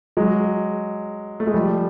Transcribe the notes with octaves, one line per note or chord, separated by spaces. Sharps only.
F#3 G#3
A3
G#3
F3 G3